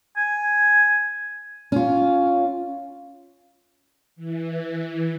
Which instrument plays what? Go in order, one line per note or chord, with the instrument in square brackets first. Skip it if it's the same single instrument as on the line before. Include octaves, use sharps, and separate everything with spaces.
[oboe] G#5
[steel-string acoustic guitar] C#4 F4
[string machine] E3